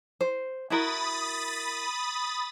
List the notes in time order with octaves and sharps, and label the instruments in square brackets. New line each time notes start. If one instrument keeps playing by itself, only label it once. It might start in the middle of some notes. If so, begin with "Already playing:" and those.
[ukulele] C5
[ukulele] E4 F#4 A#4 [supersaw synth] B5 D#6 A6